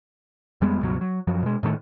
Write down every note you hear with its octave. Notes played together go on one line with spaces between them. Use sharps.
F2 G3 G#3 B3
C#2 G2 B2 F#3
F#3
F#2 F3 F#3
B2 G#3
A2 D#3 F#3 A3